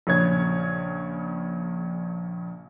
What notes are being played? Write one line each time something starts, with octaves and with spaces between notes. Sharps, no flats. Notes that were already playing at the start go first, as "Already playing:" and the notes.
A#1 C#3 C#5 G#6